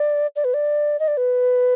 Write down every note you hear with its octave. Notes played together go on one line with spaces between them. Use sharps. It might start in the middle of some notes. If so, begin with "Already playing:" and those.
Already playing: D5
D5
B4
D5
D#5
D5
B4